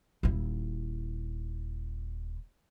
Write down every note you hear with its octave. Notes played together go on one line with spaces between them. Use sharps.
D#1 E4